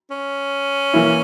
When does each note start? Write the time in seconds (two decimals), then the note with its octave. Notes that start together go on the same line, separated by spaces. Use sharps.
0.11 C#4
0.94 E3 A#3 E4